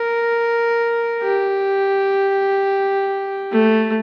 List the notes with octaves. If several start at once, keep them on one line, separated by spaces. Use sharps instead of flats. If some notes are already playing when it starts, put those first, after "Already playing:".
Already playing: A#4
G4
A3